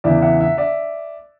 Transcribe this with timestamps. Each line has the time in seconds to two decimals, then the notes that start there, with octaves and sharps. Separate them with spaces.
0.04 E2 C#3 E3 D5 E5
0.22 E5 F#5
0.40 E5 F#5
0.57 D5 E5